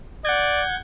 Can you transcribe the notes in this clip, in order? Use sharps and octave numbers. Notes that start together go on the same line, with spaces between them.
D5 F#5 G6 G#6